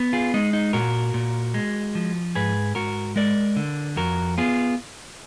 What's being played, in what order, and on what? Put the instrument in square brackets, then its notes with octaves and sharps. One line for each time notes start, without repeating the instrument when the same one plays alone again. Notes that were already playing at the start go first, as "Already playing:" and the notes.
Already playing: [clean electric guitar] B3
F4 G#4
G#3 D#4
D#4
A#2 F#4 A#4
A#2
G#3
F3
G#2 G#4 B4
G#2 F#4 A#4
G#3 A#4 D5
D3
F2 F#4 A#4
B3 F4 G#4